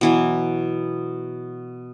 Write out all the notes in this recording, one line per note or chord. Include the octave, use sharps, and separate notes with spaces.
B2 E3 F#3